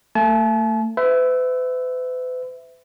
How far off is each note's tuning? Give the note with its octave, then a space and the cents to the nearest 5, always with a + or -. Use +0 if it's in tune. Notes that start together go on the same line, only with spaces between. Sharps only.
A3 +35 A5 -40
B4 +40 E5 +0